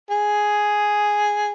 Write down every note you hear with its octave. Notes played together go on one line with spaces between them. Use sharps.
G#4